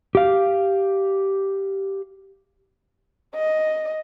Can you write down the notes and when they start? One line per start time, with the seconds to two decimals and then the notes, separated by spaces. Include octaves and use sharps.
0.15 G4 F5
3.35 D#5